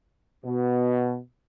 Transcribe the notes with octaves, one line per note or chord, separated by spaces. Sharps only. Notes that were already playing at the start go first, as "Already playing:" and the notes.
B2